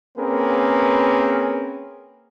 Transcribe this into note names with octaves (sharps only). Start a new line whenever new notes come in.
A#3 C4 C#4 G#4 A#4 B4